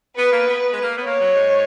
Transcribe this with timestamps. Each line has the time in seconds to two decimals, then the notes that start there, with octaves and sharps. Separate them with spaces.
0.17 B3 B4
0.32 A#3
0.46 B3
0.60 B3
0.72 G#3
0.82 A#3
0.96 B3
1.03 A#3 C#5
1.19 F#3
1.33 G#2